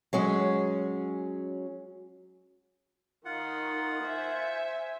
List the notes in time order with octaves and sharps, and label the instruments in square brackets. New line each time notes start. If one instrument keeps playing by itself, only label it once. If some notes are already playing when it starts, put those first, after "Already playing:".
[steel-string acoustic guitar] F#3 G#3 C#4
[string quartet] D#3 D#4 [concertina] F4 F#5
[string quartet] C5 E5 G#5